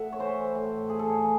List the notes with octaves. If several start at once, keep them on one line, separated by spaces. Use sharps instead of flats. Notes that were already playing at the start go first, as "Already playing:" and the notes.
Already playing: A2 E5 F#5
C#5
E3 C5
A2
A2 G#4
A4
G#4
E3